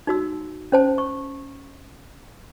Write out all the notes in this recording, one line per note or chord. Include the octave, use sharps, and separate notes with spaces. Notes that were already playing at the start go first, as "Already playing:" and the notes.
D#4 F#4 E6
C#4 C5 A5
C#6